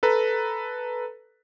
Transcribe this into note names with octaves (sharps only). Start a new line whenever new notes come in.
A4 B4 A#5